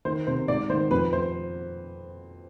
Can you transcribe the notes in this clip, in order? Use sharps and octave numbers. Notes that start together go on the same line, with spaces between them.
D#3 C5
C3 C5
G#2 D5
D#3 C5
F2 B4
C5